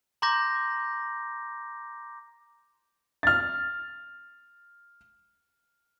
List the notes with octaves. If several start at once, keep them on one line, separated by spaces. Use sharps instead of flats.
A#5 C6 D6 G6 A#6
F6 A6